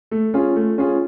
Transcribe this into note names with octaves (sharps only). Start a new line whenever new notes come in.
A3
C#4 F4 G#4
A3
C#4 F4 G#4